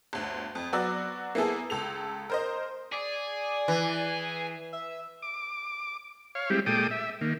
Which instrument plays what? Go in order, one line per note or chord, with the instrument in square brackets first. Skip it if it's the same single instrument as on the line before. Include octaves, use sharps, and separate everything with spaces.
[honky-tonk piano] G1 D2
F2
F#3 B3 F#4 D5 E6
A#3 B3 E4 G#4 A4
C#2 A4 F7
A#4 C5 D#5
[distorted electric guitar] G#4 [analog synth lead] D5
[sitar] E3
[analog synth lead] E5
[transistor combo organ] D6
C#5 F5
G3 G#3 C4 E4 G4
A#2 G#3 A4 G5 D6 D#6
E5
D#3 A#3